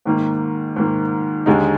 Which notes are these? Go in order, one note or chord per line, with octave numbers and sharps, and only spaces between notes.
G#2 D#3 A#3
G#2 D#3 A#3
D#2 D3 G#3 D#4